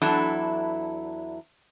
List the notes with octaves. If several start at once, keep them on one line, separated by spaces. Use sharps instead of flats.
E2 F#3 D4 E4 A4